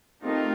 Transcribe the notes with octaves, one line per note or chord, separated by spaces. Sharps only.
A3 C4 D#4 F4 G4 A#4